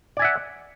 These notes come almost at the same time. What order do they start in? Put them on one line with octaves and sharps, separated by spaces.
D5 G#5 E5 F#5